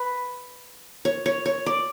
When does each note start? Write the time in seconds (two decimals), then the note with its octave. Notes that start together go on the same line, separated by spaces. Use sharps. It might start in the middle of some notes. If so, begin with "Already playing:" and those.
Already playing: B4
1.05 C#5
1.26 C#5
1.46 C#5
1.66 D5